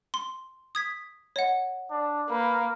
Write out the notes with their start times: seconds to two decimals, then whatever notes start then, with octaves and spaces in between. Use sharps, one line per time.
0.14 C6
0.75 D#6 G#6 B6
1.36 C#5 D#5 F#5
1.91 D4
2.31 A#3 B4